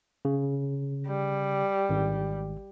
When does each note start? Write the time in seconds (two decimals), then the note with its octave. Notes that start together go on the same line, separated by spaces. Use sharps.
0.25 C#3
1.07 G3
1.89 G#1